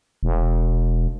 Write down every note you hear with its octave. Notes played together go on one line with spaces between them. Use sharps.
E1